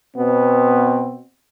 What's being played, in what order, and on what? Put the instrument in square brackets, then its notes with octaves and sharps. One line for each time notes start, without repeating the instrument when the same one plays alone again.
[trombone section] B2 B3 C4